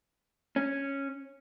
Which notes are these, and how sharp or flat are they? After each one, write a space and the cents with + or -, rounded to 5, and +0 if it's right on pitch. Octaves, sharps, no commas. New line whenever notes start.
C#4 -5